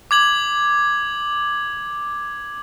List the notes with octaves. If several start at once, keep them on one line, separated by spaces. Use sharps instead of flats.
D6 G#6 F#7